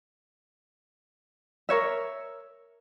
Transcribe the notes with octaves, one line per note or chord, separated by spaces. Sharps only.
A#4 C#5 E5